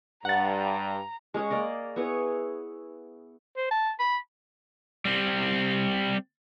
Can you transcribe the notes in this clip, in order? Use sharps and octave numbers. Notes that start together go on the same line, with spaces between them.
G2 F#5 A#5 A6
G#3 C#4 G#4 C#5
A#3 A#4 D5 D#5
B3 E4 G#4 C#5
C5
A5
B5
G3 C4